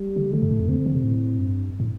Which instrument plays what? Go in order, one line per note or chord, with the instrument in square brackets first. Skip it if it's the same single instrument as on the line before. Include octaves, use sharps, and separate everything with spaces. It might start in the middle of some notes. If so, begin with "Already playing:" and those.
Already playing: [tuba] G3
[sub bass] D3
[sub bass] D3 [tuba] A3
[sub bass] G2
A2
F2
[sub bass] D3 [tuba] C4
[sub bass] D3
C3
A2
G2
A2